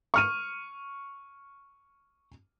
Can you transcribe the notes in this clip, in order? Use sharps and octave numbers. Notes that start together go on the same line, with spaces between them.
C#6 F6 D#7